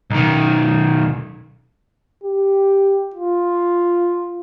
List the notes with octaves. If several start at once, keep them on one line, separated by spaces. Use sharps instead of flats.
B1 D#3
G4
F4